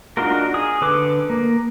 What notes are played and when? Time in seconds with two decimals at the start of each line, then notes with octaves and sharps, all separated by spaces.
0.17 D4 D#4 F4 F#4 A#4
0.54 G#4 D#6
0.81 D3 A4 B4 D6
1.30 A#3